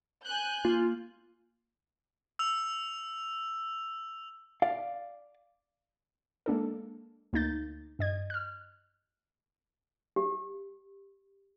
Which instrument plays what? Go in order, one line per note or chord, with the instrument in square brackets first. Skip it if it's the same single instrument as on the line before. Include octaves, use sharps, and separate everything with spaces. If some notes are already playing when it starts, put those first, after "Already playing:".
[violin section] G#5 F#6 G6
[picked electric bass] A#3 [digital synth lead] F4
[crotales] E6 F7
[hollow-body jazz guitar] D5 F5
[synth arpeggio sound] G#3 A#3 D4 A4
D2 A#3 D#4 G6 A6
G2 D#5 G#6
F6 F#6
[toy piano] G4